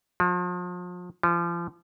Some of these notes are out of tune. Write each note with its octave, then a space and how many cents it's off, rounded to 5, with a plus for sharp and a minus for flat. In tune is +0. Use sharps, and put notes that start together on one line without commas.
F3 +40
F3 -30